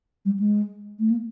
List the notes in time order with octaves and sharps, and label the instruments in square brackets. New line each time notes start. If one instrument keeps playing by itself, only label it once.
[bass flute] G3
G#3
A3
A#3